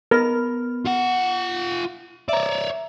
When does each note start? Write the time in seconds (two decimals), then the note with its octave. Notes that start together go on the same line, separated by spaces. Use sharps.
0.11 B3 A#4 F6
0.86 F4 F#5
2.29 C#5 D5 E5 A#5